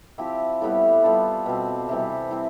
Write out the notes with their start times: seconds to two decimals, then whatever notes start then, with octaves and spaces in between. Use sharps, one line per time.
0.18 F3 C4 E4 G4
0.61 A2 G3 B3 E4
1.04 G3 B3 F4 A4
1.46 B2 G3 C4
1.89 C3 E3 G3
2.31 C4 E4